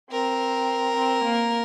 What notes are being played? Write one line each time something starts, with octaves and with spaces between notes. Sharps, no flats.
C4 A#4
C4
A#3